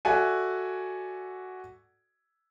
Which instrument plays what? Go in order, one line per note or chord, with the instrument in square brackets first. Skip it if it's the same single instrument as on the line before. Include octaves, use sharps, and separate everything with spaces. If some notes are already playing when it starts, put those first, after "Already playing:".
[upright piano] F#4 A4 D5 E5 G#5